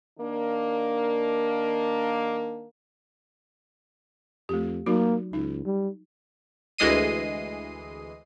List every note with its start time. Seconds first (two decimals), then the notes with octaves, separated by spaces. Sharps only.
0.19 D#3 A#3 D4
4.49 F2 A3 G4
4.86 F#3 A#3 D#4 F#4
5.33 C#2 D#4
5.65 G3
6.78 D2 E3 G#3 D#5 C7 D#7